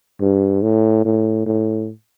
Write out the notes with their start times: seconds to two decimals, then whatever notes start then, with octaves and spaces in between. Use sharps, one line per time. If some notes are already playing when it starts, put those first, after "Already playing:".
0.21 G2
0.62 A2
1.05 A2
1.46 A2